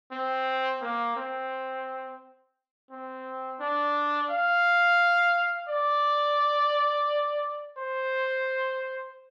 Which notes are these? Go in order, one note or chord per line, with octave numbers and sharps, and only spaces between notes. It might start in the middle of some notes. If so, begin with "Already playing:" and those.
C4
A#3
C4
C4
D4
F5
D5
C5